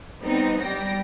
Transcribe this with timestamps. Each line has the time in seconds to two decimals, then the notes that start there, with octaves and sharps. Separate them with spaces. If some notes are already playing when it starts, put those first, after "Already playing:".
0.22 G3 B3 C4 D#4
0.62 G3 G5 A#6